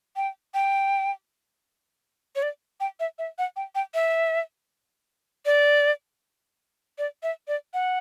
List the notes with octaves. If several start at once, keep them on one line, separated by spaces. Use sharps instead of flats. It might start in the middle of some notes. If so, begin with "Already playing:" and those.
G5
G5
C#5
D5
G5
E5
E5
F#5
G5
G5
E5
D5
D5
E5
D5
F#5